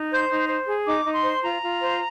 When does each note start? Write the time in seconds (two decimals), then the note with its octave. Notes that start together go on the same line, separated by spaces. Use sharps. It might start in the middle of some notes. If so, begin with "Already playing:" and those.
Already playing: D#4
0.11 C5 G6
0.30 D#4
0.49 C5
0.68 G#4
0.86 D#4 D6
1.05 D#4
1.14 C6
1.24 C5
1.43 F4 A#5
1.62 F4
1.81 C5